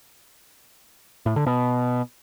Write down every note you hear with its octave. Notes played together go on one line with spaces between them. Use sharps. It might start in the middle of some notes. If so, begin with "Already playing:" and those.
A2
D3
B2